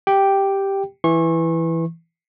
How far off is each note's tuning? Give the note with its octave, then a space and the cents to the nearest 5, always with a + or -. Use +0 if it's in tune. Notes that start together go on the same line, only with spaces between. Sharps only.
G4 +0 G5 +0
E3 +0 C#6 -35